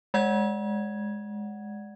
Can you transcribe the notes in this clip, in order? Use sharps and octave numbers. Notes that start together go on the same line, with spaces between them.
G#3 D5 F#5 G#6